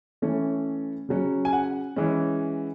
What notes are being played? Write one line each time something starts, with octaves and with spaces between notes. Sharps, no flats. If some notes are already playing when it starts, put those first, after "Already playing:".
E3 A3 C#4
C#3 F#3 C#4
G#5
F#5
E3 G#3 C#4